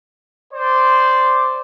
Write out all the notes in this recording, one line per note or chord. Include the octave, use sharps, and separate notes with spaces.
C5 D5